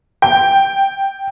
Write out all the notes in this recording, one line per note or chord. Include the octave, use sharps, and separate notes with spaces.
G5